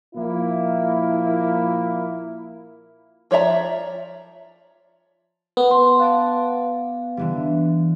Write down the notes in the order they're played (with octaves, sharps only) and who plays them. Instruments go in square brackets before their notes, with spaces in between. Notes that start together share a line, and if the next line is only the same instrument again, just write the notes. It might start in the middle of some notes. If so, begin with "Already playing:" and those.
[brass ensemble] A#2 F3 A#3 E4
[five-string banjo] F3 C#5 D5 E5 A#5
[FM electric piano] B3
[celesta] C6
[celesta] F5 [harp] F#5 A5 D6
[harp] D3 E3 G3